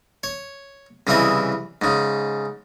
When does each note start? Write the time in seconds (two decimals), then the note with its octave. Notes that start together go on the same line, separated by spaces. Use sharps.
0.23 C#5
1.07 C2 C#3 E3 C4 E4 D#5
1.82 G#2 C#3